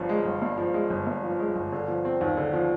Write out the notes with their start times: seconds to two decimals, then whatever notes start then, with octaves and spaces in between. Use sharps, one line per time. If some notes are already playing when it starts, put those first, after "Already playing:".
Already playing: G1 G2 F3
0.09 G#3
0.25 G1
0.42 G2
0.58 F3
0.74 G#3
0.90 G1
1.07 G2
1.23 F3
1.39 G#3
1.56 G1
1.72 D3
1.88 F3
2.05 C4
2.21 D#2
2.37 D3
2.53 F3